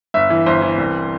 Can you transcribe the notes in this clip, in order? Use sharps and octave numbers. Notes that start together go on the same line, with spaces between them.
G1 E5
E3
G1 C5
E3
C2